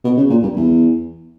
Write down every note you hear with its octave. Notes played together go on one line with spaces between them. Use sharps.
B2
C#3
A#2
G2
E2